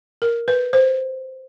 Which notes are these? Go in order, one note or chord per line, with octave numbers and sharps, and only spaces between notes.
A#4
B4
C5